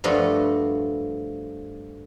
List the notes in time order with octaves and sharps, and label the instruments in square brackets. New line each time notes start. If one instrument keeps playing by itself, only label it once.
[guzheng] G2 F3 A3 F#4